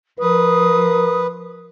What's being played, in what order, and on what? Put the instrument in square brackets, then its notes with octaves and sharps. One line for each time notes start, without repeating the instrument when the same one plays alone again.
[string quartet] F3 [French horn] A#4 [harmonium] B4 [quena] D#6